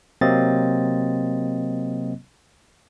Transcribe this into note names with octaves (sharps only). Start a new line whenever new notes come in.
C3 F#3 A#3 C4 D#5 A6